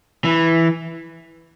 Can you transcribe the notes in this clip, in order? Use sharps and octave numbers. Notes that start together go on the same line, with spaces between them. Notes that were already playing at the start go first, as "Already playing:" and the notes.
E3